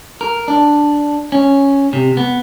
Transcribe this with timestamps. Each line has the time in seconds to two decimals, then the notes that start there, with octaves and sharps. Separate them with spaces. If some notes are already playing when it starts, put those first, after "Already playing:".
0.21 A#4
0.48 D4
1.32 C#4
1.93 C3
2.17 B3